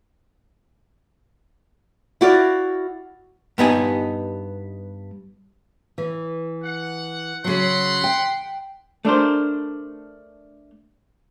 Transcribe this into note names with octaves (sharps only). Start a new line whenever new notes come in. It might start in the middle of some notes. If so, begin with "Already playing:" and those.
E4 F#4 D5 F5
G2 B3 D#4 G#5
E3
F#5
C#3 F#3 F#5 B5 C6
G5
A3 D4 A#4 C5